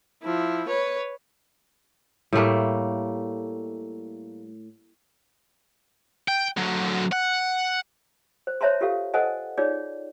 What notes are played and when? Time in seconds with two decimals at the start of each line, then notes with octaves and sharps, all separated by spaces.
0.23 F3 E4
0.68 B4 C#5
2.33 A2 G3 A3 A#3
6.28 G5
6.57 D3 F#3
7.12 F#5
8.47 C5
8.61 C5 C#5 E5 A5 A#5 C6
8.81 F4 G4 A4 F5
9.14 A4 C5 D#5 F#5 G#5 A5
9.57 D#4 F4 G#4 C#5 D5